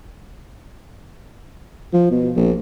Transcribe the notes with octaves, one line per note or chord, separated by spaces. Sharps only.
F3
B2
A#1